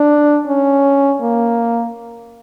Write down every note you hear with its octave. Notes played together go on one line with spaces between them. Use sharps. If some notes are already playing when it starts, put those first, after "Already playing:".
Already playing: D4
C#4
A#3